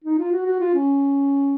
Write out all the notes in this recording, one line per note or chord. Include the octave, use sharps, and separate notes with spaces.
D#4
F4
F#4
F#4
F4
C#4